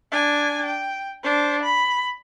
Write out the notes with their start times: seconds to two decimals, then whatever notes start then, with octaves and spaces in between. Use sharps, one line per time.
0.12 D4 G#5
0.66 G5
1.23 D4 C5
1.63 B5